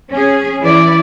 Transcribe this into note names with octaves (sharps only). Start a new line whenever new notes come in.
C#4 G#4
E3 E4 D5